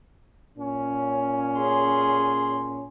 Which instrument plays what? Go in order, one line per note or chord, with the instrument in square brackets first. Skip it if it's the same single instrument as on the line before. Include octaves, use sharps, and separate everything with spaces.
[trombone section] A#2 C#4
[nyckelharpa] G#4 C6